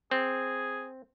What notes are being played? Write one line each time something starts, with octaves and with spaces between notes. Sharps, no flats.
C4 G#4